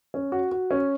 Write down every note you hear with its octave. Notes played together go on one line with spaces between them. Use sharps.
C#4
F#4
F#4
C#4